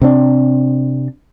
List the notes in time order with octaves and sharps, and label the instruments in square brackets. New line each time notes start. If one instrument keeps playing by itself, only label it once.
[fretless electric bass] C3 C4 D4